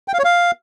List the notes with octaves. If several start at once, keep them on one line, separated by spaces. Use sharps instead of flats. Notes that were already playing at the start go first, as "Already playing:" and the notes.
G5
F5
C#5
F5